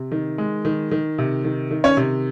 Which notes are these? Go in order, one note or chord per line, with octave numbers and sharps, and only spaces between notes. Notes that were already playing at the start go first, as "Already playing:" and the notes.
Already playing: C3
D#3
G#3
D#3
D#3
C3
D#3
D#3
C#4 C#5
C3